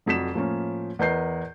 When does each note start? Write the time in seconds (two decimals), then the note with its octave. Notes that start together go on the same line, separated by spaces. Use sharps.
0.06 F1 F2 F#3 B6 E7
0.34 A2 F3 A#3 C#4
0.99 E2 A#4 B4 D#5 G6 C7